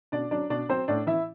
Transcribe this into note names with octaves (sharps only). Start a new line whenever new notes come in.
B2 D4 D5
F#3 D4 D5
B2 D4 D5
F#3 C4 C5
A2 D4 D5
E3 E4 E5